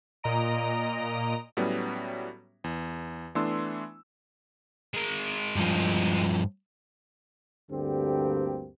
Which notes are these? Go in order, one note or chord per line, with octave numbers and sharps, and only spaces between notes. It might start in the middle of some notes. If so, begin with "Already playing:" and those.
A#2 D#5 A#5 D7
A2 F#3 G3 B3 C#4
E2
E3 A3 B3 D4 C6 E6
G#3 A#4
G2 F3
D2 G2 D3 A#3 C4 G4